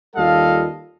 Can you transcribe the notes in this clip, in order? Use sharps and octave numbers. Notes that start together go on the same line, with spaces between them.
D#2 G3 F4 A4 D#5 F5